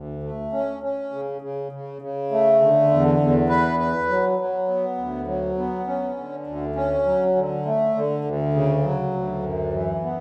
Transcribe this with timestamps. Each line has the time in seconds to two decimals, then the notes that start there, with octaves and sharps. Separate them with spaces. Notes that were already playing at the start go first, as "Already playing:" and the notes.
Already playing: D2
0.23 A3
0.52 C#4
0.83 C#4
1.12 C#3
1.41 C#3
1.72 C#3
2.02 C#3
2.31 A3
2.61 D3
2.91 E2
3.20 E2
3.49 B4
3.79 B4
4.09 F#3
4.39 F#3
4.68 B3
4.97 D2
5.27 F#3
5.57 B3
5.87 C#4
6.17 D3
6.47 D2
6.75 C#4
7.06 F#3
7.35 D3
7.65 A3
7.95 D3
8.25 D2
8.54 C#3
8.84 F#3
9.14 D2
9.43 F#2
9.73 E3
10.03 B3